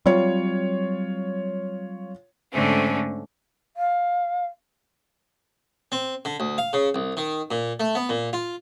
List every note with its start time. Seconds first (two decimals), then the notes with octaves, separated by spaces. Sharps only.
0.06 F#3 G3 C4 F4 C#5
2.52 G#2 D3 A3 C4 C#4
3.76 F5
5.92 C4
6.25 D3
6.40 D2
6.58 F5
6.73 C#3
6.95 C2
7.17 D#3
7.51 A#2
7.80 A3
7.95 B3
8.09 A#2
8.33 F4